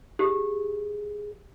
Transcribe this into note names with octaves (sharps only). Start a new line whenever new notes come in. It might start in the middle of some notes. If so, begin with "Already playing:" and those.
G4 G#4